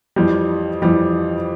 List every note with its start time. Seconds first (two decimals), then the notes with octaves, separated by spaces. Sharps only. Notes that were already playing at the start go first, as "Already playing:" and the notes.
0.16 F2 E3 G3
0.82 F2 E3 G3